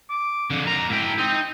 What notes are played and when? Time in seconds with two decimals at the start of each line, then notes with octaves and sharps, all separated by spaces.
0.10 D6
0.51 F2 D3
0.66 F2 A#4 A#5
0.90 G#2 E4 G5
1.19 C4 D#4